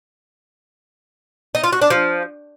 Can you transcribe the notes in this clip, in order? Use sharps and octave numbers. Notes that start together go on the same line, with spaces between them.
D#4
F4
F#4
D4
F3